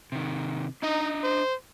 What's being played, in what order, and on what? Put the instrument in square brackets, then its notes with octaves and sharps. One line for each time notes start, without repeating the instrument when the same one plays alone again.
[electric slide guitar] C3 D#3
[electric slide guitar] D4 D#5 A#5 [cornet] D#4
[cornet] C5